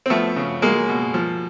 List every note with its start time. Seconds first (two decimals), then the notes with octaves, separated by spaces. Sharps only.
0.06 C4
0.10 F3 A3 B3
0.36 C#3
0.62 F#3 G#3 A#3
0.89 B2
1.14 F3